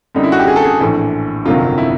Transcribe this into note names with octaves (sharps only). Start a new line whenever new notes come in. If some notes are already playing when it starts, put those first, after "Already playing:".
F#2 D3 G3 D#4
E4
F#4
G4
G#4
A4
G#4
A#1 A2 E3 A3
G1 F2 C3 D#3 F#3 F4
E4